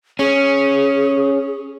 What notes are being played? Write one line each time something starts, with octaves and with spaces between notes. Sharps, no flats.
C#4 G#4